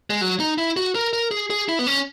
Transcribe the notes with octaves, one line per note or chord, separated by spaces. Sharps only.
G#3
F#3
D#4
E4
F#4
A#4
A#4
G#4
G#4
E4
B3
C#4